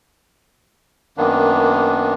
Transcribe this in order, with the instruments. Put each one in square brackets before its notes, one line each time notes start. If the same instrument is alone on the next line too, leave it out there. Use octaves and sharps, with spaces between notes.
[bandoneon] F#2 D#3 A#3 B3 D4